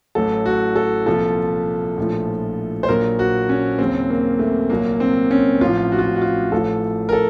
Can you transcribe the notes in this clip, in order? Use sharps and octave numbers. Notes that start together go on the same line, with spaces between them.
A1 A2 F#3 A4
F#4
A4
C2 A#2 F3 A4
A#1 A2 F3
C5
A#1 A#2 F#3 A#4
F#4
C#4
D#2 C#3 F#3 C4
A#3
A3
C2 A#2 F#3 A#3
C4
C#4
A1 A2 F3 F4
F#4
F4
F#4
F#4
F4
A1 A2 F3 A4
A#4
A4